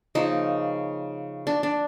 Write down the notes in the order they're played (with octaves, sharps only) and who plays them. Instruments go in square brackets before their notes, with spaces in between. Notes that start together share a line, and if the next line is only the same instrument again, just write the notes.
[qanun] C#3 F3 A#3 D#4
D4
D4